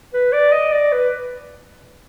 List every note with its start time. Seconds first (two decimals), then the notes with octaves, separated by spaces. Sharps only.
0.14 B4
0.33 D5
0.53 D#5
0.72 D5
0.92 B4